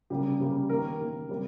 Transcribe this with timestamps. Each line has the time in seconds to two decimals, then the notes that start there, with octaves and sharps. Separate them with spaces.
0.10 C#3 G3 A#3 G4
0.40 C#3 G3 A#3
0.69 D#3 A#3 A#4
1.00 D#3 A#3
1.29 C3 G3 A#3